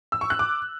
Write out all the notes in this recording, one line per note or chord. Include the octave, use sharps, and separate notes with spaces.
E6
C#6
F#6
D6